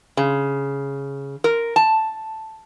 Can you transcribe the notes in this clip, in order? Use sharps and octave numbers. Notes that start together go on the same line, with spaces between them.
C#3
A#4
A5